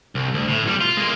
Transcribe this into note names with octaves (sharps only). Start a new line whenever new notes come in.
C2
D2
A2
B1 G3
F4
G#3 A#3